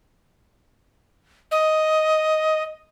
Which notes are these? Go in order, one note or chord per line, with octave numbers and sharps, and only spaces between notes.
D#5